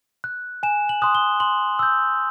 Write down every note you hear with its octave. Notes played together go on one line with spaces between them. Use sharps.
F#6
G#5 E7
F#7
C6 D#6 F#6
G7
C6 F#7
E6 G6